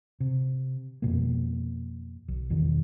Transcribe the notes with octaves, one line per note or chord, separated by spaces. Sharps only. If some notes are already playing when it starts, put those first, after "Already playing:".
C3
F2 B2 A#3
B1
E2 B2 D#3